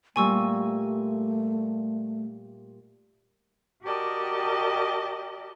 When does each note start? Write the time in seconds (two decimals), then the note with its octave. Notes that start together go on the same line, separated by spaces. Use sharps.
0.16 A#2 G3 A3 G#5 C#6 E6
3.83 F#4 G4 A#4 D5 D#5 A5